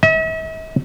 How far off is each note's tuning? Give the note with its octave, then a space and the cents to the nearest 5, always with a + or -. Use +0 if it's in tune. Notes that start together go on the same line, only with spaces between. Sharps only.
E5 -45